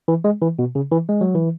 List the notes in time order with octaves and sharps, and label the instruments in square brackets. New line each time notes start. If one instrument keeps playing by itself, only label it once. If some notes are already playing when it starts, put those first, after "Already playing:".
[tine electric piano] E3
G#3
E3
B2
C#3
E3
G#3
F#3
E3